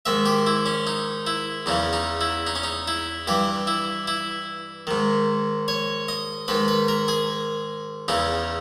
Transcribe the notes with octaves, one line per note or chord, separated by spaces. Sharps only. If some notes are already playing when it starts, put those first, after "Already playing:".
G#2 D#3 E5
G4
E4
C#4
D#4
E4
E2 C#3 E3 D#4
D#4
E4
D#4
C#4
D#4
E4
G2 E3 G4
E4
E4
G#2 D#3
C#5
D#5
G#2 D#3 B4
B4
A#4
G#4
E2 C#3 E3 D#4